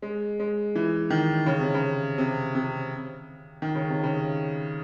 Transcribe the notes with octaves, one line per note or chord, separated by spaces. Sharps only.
G#3
G#3
E3
D#3
C#3
C3
C#3
C3
C3
D#3
C#3
C3
C#3